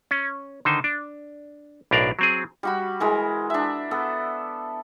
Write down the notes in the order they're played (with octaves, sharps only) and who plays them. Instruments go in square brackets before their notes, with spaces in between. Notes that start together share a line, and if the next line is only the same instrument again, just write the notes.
[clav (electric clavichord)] C#4
D3 D#3 D#4 C5
D4
B1 A2 D4 A#4 D5 F5
F#3 C4 G#4
[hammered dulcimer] G3 F#4 B5
E3 G#3 A#4
D4 E5
B3 A4